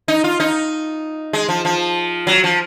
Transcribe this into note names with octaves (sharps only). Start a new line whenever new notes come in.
D#4
F4
D#4
G#3
F3
F3
F#3
F3